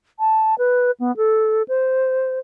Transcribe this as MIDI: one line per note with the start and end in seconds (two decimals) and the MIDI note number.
0.19 0.55 81
0.58 0.91 71
1.00 1.15 59
1.17 1.62 69
1.68 2.39 72